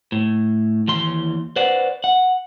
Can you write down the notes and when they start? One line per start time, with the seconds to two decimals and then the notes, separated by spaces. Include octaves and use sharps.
0.12 A2
0.88 D#2 E3 C6
1.56 B4 C5 D5 F#5
2.04 F#5